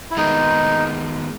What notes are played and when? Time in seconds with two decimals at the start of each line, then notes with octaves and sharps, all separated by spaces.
0.11 E4
0.17 D#3 G#3 B3 D#4